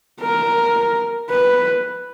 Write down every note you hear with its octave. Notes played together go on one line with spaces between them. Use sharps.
A#4
B4